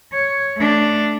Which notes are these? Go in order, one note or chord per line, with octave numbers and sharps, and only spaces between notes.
C#5
A3 D4